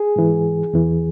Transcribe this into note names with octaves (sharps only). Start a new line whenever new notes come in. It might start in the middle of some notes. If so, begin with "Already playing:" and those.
Already playing: G#4
G#2 E3
E2 E3